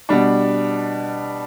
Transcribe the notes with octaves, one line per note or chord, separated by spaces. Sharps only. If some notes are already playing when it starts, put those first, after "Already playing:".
B2 G3 D4